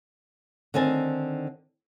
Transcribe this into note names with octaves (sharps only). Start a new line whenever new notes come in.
D3 D#3 C4 G#5 A5